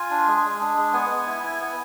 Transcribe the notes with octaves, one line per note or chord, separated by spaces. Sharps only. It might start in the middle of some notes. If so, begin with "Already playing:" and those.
Already playing: F4 G#5
D4
G#3
G#3
D4
G#3
B3 G#5
B3
E4
E4
B3